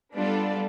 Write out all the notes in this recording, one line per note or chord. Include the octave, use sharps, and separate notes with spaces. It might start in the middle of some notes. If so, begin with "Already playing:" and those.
G3 B3 D4 F4 A4 D5